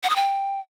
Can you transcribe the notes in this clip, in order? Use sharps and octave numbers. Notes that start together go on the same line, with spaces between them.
F#5
D#6
G5